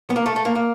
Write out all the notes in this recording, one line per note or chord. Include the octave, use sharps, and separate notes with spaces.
B3
A#3
A3
A3
A#3
A#3